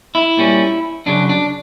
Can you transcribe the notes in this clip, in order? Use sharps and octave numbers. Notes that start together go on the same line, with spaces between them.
E4
A#2 G3 C#4
F#2 C#3 F#3 D4
D4